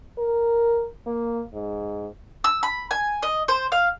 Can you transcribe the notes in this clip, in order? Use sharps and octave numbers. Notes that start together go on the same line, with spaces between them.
A#4
A#3
G#2
E6
B5
G#5
D#5
C5
F5